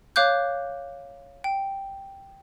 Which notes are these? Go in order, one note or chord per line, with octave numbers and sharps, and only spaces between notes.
C#5 F5 D6 F#6 G6
G5